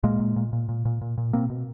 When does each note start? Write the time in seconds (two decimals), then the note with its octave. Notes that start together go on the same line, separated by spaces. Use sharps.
0.04 A#2 G#3 A#3
0.20 A#2
0.36 A#2
0.53 A#2
0.69 A#2
0.85 A#2
1.01 A#2
1.18 A#2
1.33 B2 A#3 C4
1.50 B2